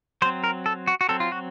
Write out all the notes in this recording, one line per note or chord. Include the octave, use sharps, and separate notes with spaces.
F#3 C4 C5
A#4
A4
F#4
F#4
F#3 C4 A4
F4
F#4